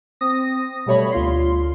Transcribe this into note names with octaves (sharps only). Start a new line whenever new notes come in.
C4 D#6 A#6
B2 G3 A3 C#5 B5
D2 F4 C6